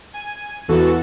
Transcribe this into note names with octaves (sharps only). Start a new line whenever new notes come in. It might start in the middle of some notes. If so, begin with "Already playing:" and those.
G#5
E2 E3 F#4 A4